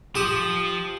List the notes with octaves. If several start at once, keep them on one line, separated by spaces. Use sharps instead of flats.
F3 G4 D#6